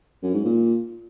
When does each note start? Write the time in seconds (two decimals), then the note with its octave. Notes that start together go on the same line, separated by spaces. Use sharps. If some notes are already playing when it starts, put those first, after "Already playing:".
0.23 F#2
0.34 G#2
0.45 A#2